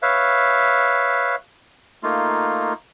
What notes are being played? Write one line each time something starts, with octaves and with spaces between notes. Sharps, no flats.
B4 C#5 E5 F5
A3 A#3 D#4 F4